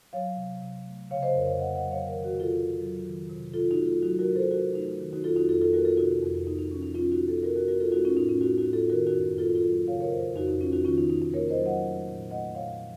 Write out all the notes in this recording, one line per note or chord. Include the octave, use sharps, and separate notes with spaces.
F#3 C#5 F5
C3
C3
A3
C#3 C#5 F5
C5 D#5
F2 A#4 C#5
C#5 F5
A#3 D#5 F#5
D#5 F#5
F#3
C#5 F5
D#3 A#4 C#5
F#4 A#4
C3
F4 A4
C3
F#3
D#3
C3
C3 F4 A4
D#4 F#4
A3
F4 A4
F#3 D#4 F#4
F#4 A#4
C3
A4 C5
C3 F#4 A#4
A3 D#4
D#3
D#4 F#4
F2 F4 A4
D#4 F#4
F2 F4 A4
F4 A4
A#3 F#4 A#4
F4 A4
C3 D#4 F#4
F2
A#3 D#4
D#4
F3 C#4
D#4
F3 C#4 F4
D#4 F#4
C3
F4 A4
A4
C3 F#4 A#4
F#4 A#4
A3 F#4 A#4
F4 A4
A3 D#4 F#4
C#4 F4
A2 D#4
C#4 F4
A3 D#4 F#4
D#4 F#4
A2
F4 A4
D#3 F#4 A#4
D#4 F#4
F#2
A#3 F4 A4
F4 A4
F#3
C#3 C#5 F5
A#4 C#5
F2 C5 D#5
F2 D#4 F#4
D#4
F3 C#4 F4
D#4 F#4
D#3 C#4 F4
D#4
C3 D#4
D#4
A#3 A#4 C#5
C5 D#5
F#3
D#5 F#5
A3
A#2
A3 D#5 F#5
A#2 C#5 F5
F3